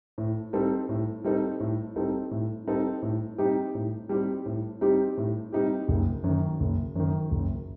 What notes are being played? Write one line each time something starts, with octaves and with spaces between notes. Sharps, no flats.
A2
G3 C4 D#4 A4
A2
G3 C4 D#4 A4
A2
G3 C4 D#4 A4
A2
G3 C4 D#4 A4
A2
G3 C4 D#4 G4
A2
G3 C4 D#4 G4
A2
G3 C4 D#4 G4
A2
G3 C4 D#4 G4
F#1
F#2
D#3
F#1
F#2 D#3
F#1